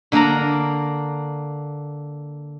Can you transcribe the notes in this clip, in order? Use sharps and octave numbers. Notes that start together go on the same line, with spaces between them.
D3 A#3 D4 A#4 A#5